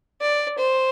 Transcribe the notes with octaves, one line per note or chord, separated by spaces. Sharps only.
D5
C5